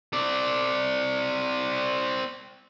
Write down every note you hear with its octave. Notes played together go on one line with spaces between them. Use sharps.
C4 D5